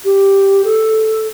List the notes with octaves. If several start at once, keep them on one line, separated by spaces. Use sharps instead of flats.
G4
A4